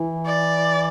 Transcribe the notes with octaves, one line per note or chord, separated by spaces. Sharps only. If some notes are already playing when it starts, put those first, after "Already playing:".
Already playing: E3
D5